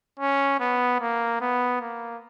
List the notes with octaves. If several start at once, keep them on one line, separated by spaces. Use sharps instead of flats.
C#4
B3
A#3
B3
A#3